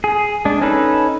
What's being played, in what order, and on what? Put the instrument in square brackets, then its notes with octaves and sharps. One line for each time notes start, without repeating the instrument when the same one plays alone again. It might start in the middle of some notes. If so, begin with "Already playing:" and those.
[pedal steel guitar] G#4
G#3 D4
C#4 D#4 A4 B4